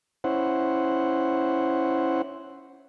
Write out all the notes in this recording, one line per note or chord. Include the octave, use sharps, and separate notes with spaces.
C#4 E4 C5 F#5